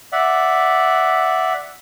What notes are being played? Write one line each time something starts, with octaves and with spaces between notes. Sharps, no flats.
D5 E5 F#5